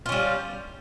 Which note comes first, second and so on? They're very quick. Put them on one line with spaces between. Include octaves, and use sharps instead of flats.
F4 C#4 G3